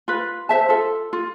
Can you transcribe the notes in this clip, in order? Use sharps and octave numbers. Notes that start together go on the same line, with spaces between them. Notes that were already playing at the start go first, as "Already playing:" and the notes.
F4 B4
C5 E5 A5
F4 A4
F4